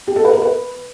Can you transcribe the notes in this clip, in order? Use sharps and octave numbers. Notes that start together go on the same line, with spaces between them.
G4
A4
B4
A#4
B4